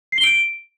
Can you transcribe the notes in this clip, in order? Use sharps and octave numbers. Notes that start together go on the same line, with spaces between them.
C7
G7
D7